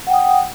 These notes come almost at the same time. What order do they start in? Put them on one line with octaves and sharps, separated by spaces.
F#5 G5 D#6